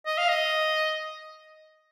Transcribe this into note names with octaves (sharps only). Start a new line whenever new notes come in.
D#5
F5
D#5